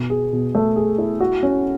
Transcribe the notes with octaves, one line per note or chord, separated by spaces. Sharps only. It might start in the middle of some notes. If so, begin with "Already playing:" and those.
Already playing: B2
G#4
B2
A3
G#4
E4
F#4
C#4